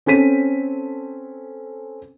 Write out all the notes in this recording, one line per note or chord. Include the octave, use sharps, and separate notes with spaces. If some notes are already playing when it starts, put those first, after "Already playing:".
C4 C#4 A4 B6 D#7